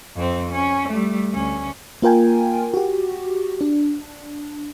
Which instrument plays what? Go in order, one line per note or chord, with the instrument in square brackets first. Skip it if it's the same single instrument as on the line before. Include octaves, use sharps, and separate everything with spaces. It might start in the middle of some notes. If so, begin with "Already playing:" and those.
[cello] F2 C4
C#4
G3 A3
D2 C#4
[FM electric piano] A#3 F4 A#4 G5 G#5
F#4 G4
D4